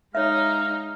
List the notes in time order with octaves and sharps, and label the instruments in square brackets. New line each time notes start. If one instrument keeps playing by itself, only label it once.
[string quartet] G#3 D#4 [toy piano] C#5 E5 [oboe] F5